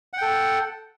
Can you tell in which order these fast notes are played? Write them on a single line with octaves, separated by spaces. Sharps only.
F#5 G5 A4